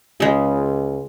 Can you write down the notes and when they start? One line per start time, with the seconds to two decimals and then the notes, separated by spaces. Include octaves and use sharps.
0.20 C#2 C#3 G#3